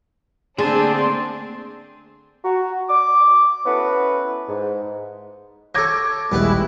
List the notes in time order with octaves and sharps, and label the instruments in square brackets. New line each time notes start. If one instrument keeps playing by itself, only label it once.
[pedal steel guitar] D3 A3 A5 [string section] A#3 C4 D4 [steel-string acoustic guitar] G#4 [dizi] C6
[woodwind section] F#4 A#5
D6
B3 C#4 E4 F#4 A4 B4
G#2
[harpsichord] A4 C#5 [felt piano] D6 G#6 A#6
[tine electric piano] A#1 D#2 G3 [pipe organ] G#3 E4 [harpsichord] B3 G4 B4